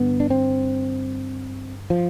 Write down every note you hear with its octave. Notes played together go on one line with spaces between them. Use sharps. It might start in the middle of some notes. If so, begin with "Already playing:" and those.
Already playing: G2 D3 B3
D4
C4
F3